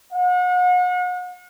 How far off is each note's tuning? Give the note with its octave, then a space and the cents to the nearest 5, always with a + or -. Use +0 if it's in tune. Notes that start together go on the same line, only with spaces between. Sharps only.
F#5 -40